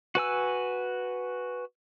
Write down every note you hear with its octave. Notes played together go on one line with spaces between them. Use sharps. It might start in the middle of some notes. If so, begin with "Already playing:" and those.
F#4 B4 G#5 E6